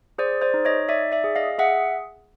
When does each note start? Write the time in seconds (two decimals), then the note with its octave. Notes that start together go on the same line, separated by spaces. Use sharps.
0.18 G#4 C5 D5
0.41 C5 D5
0.54 D#4
0.65 C#5 D#5
0.89 D#4 D5 E5
1.12 D5 E5
1.24 G#4
1.36 D#5 F5
1.59 G#4 E5 F#5